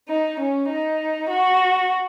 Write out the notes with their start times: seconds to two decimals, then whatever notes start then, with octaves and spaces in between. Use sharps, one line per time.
0.09 D#4
0.40 C#4
0.69 D#4
1.30 F#4